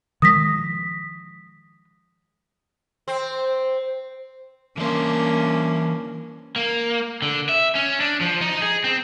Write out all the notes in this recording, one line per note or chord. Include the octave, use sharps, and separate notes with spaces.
D#3 F3 G#3 D#6 A#6 B6
C4
E3 A#3 C#4 D4 C5
A#3
D3
E5
C#4
D4
F3
D#4
G#4
C4